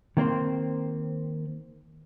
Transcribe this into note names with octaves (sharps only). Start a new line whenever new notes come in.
D#3 A#3 C4 C5